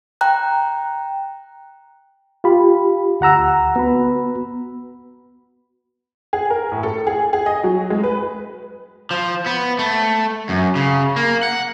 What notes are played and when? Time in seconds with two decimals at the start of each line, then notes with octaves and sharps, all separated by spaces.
0.21 G5 A#5 F#6
2.44 F4 G4 B5
3.21 D2 F#5 A#5 E6
3.76 B3 F#4 B5
6.33 G#4
6.50 A#4
6.72 A2
6.83 A4
7.07 G#4
7.33 G#4
7.46 D#5
7.64 F#3
7.90 G#3
8.04 B4
9.11 F3
9.46 B3
9.79 A3
10.49 F#2
10.76 C#3
11.16 A#3
11.43 F#5